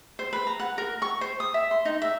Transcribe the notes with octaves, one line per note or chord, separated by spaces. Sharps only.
C5
B4
A#5
F#5
A#4
C#6
C5
D#6
E5
C6
D#4
E5